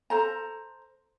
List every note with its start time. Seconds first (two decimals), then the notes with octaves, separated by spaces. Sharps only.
0.10 A4 C5 A#5